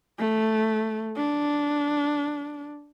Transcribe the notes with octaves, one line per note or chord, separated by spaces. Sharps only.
A3
D4